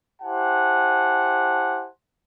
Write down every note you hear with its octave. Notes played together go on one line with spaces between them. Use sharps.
E4 G4 C5 F#5 G#5 A5